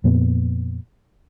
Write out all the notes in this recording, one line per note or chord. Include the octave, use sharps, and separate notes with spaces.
F2 A#2 B3